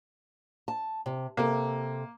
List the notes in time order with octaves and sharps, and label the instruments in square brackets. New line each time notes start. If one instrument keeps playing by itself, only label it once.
[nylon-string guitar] A5
C3
[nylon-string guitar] C3 A4 [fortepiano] A#3